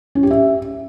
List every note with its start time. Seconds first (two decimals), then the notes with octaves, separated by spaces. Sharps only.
0.15 C#4
0.23 G4
0.31 E5